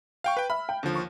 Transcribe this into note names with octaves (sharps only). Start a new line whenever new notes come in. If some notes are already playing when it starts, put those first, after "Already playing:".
F5 G5 C#6
B4 G5
E5 B5 F6
G5
D#2 D3 F3
C#6